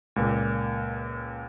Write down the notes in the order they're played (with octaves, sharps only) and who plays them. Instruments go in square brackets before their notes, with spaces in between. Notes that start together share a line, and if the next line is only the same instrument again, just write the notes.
[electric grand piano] C#2 A#2 A#3